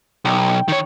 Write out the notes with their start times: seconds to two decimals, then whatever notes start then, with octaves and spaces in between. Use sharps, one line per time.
0.25 B1 G5
0.68 D#3 C#5